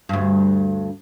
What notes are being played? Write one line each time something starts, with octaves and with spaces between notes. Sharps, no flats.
D2 G2